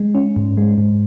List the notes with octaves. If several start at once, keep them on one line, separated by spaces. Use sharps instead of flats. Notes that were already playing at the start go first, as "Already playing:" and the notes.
Already playing: G#3
C#4
G#2
G#3
G#2